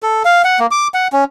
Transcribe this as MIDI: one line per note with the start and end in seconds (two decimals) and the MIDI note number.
0.03 0.23 69
0.25 0.42 77
0.44 0.59 78
0.60 0.67 58
0.71 0.88 86
0.94 1.08 78
1.13 1.24 61